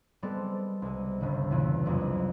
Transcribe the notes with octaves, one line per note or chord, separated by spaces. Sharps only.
G3 G#3 B3 C4 A4
C2 G#3
G1 C#2 C#3
E1 E2 A#2 E3
C2 F2 F#3 G#3